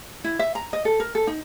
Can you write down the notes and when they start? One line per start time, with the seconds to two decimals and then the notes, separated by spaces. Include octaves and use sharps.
0.24 E4
0.39 E5
0.55 A#5
0.73 D#5
0.85 A4
1.00 A#4
1.15 A4
1.27 D#4